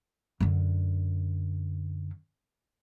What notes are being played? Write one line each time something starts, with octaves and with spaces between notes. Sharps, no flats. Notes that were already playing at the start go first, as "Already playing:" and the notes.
F#2 D3